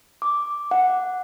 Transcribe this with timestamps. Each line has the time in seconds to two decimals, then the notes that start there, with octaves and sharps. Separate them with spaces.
0.22 D6
0.71 F#5